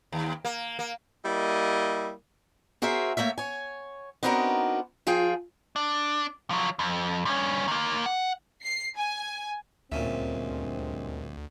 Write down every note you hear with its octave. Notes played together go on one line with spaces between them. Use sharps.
D#2
A#3
A#3
G3 A#3 E4 D#5
F#4 G#4 A#4 C5 E5
A3 A#3 C#5 E5
C#5 G#5
B3 C4 D4 D#4 F#4 A#4
F3 F4 G#4 F5 G5
D4
F3 F#3
F2
G2 C#4
D#3 A#3
F#5
C7
G#5
D2 G2 A#2 G#3 C4 C#4 E5